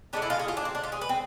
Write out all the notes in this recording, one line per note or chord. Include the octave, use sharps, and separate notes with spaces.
D3 G#3 B3 D4
E4
F4
G#4
F4
D4
C4
D4
F4
G#4
B4
C4